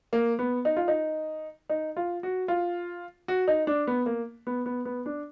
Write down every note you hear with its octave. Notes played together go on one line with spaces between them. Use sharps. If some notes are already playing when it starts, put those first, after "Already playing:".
A#3
B3
D#4
F4
D#4
D#4
F4
F#4
F4
F#4
D#4
D4
B3
A#3
B3
B3
B3
D4